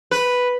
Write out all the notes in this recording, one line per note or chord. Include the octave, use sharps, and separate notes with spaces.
B4